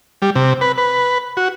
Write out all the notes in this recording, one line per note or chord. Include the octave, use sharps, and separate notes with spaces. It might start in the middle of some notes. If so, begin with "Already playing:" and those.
G3
C3
B4
B4
F#4